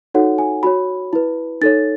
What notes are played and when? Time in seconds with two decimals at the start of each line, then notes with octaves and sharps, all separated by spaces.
0.14 D#4 F#4 A4 C#5 F#5
0.38 G#5
0.63 F#4 C#5 B5
1.13 E4 B4
1.61 D#4 A4 C#5 A6